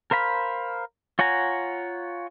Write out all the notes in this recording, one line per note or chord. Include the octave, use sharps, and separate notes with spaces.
A#4 C5 F5 B5
F4 C#5 F#5 G#5 A#5